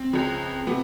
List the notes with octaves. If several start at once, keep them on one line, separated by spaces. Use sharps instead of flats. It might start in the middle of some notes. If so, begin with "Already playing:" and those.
Already playing: C4
C#2 C#3 F3
C3 F3 B3